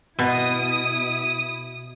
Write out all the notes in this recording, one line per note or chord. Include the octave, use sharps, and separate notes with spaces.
B2 E4 D#6